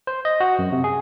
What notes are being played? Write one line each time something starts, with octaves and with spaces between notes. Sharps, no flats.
C5
D#5
F#4
F#2
C3
G#4